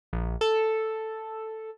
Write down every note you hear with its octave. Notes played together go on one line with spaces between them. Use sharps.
A#1
A4